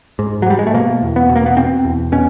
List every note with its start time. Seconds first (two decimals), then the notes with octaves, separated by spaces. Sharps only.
0.19 G#2
0.42 F#3
0.46 G#2 G3
0.59 G#3
0.67 A3
0.74 B2 A#3
1.02 E2
1.16 B3
1.29 B2
1.36 A#3
1.46 B3
1.57 B2 C4
1.85 E2
2.12 B2 C#4